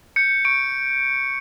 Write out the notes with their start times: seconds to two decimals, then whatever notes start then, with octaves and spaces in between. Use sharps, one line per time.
0.16 G6 C#7
0.45 C#6 D7